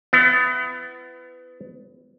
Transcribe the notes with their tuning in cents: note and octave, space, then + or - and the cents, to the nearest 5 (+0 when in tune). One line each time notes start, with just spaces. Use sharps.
B3 +30 E4 +35